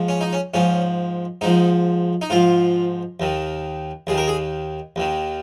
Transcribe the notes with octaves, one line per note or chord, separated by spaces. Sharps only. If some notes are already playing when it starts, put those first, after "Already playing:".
Already playing: G#2 F3
C#4
D#4
C#4
G#2 F3 C#4
G#2 F3 D#4
D#4
G#2 F3 F4
D#2 D#3
D#2 D#3 G#4
A#4
G#4
D#2 D#3